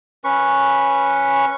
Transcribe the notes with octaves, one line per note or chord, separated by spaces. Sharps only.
C#4 B4 C#6